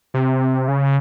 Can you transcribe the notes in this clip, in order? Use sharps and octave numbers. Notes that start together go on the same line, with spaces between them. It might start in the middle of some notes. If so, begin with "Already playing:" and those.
C3
C#3